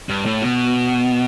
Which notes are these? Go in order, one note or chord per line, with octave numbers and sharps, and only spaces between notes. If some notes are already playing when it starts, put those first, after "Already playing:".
G2
A2
B2